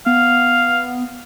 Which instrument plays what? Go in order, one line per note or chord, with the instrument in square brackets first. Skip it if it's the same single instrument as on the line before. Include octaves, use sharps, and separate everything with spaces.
[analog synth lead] B3 [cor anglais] F5